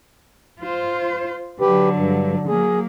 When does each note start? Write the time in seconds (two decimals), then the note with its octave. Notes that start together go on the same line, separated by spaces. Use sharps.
0.60 F4 C5
1.61 D3 F#3 G4 B4
1.96 G2
2.48 F#3 A#3 G#4